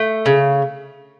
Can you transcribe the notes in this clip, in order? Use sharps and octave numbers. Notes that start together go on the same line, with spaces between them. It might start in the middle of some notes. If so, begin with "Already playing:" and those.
Already playing: A3
C#3